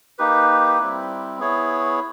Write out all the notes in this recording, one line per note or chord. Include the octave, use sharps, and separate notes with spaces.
A#3 D#4 G4 B4
G3 C4 E4
B3 E4 G#4 C#5